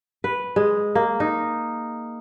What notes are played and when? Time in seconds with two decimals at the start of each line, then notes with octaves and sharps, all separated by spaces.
0.24 B4
0.56 G#3
0.95 A#3
1.20 D#4